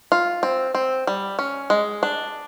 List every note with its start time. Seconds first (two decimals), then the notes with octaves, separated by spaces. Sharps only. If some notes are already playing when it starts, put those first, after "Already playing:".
0.12 F4
0.43 C4
0.75 C4
1.07 G3
1.39 C#4
1.70 G#3
2.03 D4